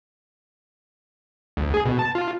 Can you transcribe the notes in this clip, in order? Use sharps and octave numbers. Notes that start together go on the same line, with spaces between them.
D2
G#4
B2
A5
F4